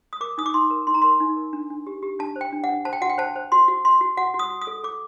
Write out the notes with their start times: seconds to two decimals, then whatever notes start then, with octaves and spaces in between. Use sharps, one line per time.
0.13 D#6
0.21 A#4 D6
0.38 D#4 D#6
0.46 D6
0.54 D#4 C6
0.70 A#4
0.87 D#4 C6
0.94 A#5
1.02 A#4 C6
1.20 D#4
1.37 A#4
1.53 D4
1.70 D4
1.87 G4
2.03 G4
2.19 D4 A5
2.36 C5
2.41 G5
2.52 D4
2.64 F#5
2.69 D4
2.85 C5 A5
2.93 G5
3.01 F#4 F#5
3.10 G5
3.18 C5 A5
3.36 C5
3.52 F#4 C6
3.68 F#4
3.84 F#4 C6
4.01 F#4
4.17 F#4 F#5
4.34 F#4
4.39 D#6
4.51 F#4
4.61 D#6
4.67 A4
4.84 A4 D6